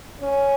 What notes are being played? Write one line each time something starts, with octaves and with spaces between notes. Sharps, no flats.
C#4